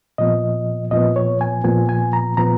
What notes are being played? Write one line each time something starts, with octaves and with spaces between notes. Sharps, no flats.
A#2 F3 B3 D#5
A#2 F3 B3 D#5
C#5
G#5
A#2 F3 B3 G#5
G#5
A#5
A#2 F3 B3 A#5